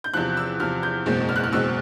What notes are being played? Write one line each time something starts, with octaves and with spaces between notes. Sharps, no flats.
G6
E2 C3 F3 F#6
E6
E2 C3 F3 F6
G6
F#1 E2 B2 G#3 C4
F6
F#6
F6
F#1 E2 B2 G#3 C4 E6